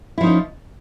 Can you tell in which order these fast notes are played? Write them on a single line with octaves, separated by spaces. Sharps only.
E4 F3 D#4 C#4